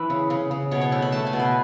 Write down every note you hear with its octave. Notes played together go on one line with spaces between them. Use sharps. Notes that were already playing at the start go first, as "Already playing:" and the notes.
Already playing: E3 B4
C#3
C#3
C#3
B2 C#5
C#5
A3 C#5
B5
A3 A5
G#5
B2
B4